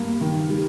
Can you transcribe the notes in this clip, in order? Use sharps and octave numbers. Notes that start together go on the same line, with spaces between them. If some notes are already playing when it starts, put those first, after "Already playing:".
Already playing: G2 A#3
D#3
G3